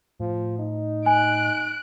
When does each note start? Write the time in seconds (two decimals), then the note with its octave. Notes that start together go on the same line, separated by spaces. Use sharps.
0.20 A2 F3
0.59 D#4
1.06 G#5 F#6 D7